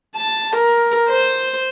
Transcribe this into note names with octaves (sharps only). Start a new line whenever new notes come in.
A5
A#4
C5